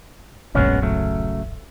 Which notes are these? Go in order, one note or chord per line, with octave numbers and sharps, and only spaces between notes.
D1 A#1 F#2 G#3 B3 C#4
C#3 F#3 A3